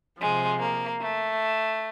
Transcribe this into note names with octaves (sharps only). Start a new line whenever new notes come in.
C3 F3 G#3
A#3
A3